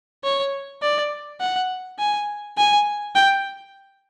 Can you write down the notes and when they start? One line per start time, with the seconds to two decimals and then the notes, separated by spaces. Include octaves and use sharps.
0.24 C#5
0.82 D5
1.41 F#5
1.99 G#5
2.58 G#5
3.15 G5